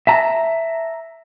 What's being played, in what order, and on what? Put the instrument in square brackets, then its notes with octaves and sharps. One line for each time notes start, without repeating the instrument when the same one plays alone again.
[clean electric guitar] E5 A5 A#5